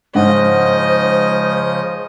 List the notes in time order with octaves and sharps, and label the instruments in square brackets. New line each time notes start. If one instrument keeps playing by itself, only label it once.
[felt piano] G#2 F#5 [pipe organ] C#3 F3 [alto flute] C5 [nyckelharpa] D#5